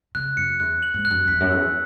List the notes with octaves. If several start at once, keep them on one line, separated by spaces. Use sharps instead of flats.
C#3 F#6
F#2 C#7
E2 F#6
F#7
G#2
F#6
F#2
E2 B6
F#2
E2 E6